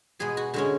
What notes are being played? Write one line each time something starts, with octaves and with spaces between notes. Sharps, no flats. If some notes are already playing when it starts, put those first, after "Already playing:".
B2 G#3 B3 G#4
F#4
D3 G#3 C#4 F#4